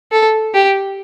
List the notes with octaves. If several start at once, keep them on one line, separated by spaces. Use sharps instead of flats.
A4
G4